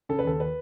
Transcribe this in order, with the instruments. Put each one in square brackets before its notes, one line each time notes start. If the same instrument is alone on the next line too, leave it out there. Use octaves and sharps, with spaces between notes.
[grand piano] C#3 A4
B4
D#2 A4
B4